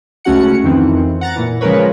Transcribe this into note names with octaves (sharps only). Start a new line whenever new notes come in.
C#2 A3 C#4 F#4 F#5 C#7
F2 D#3 E3 C4
F#5 A#5 A6
A#2 E3
C#3 F3 G#3 A#4 B4 C#5